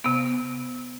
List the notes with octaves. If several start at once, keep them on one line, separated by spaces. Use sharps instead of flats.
C3 B3